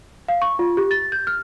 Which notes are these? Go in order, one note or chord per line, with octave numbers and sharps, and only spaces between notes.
F5
C#6
F4
G4
A6
G6
F6